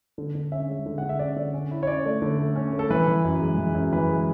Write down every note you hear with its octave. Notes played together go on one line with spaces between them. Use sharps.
D3
D3
C#4 E5
G#3
D3
D3 F#5
E5
C#4 D5
D3
C#4
E4
C#5
C#4 D5
A3
D3
A3
C#4
A3
A4
E3 B4
E3
F#2
G#3
E3
F#2
E3 B4
G#3